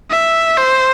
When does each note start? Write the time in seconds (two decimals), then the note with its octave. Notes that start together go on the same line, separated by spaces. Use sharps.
0.11 E5
0.57 C5